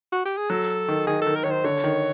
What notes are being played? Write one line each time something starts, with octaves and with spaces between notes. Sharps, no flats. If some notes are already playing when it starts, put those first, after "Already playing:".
F#4
G4
G#4
F#3 A4
D#3
D#3 G#4
D#3 A4
A#4
D#3 C#5
C5
D3 C#5
D#3